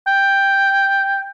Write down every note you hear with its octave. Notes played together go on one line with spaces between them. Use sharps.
G5